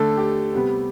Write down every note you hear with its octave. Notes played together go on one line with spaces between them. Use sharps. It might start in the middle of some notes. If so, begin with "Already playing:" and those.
Already playing: D3 A3 A4
G4
C3 G3 B3